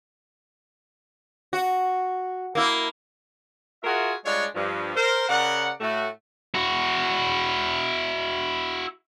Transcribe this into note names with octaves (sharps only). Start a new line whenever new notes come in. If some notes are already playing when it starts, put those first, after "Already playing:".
F#4
A#3 E4
F4 F#4 G#4 A#4 E5
G3 G#3 D4 F4 C#5
G2 F3
A#4 C5
C#3 A#4 D5 F#5
A2 A3 F#4
E4 F#4